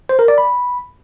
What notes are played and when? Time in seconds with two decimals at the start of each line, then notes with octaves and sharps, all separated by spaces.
0.09 C5
0.19 A#4
0.28 D5
0.38 B5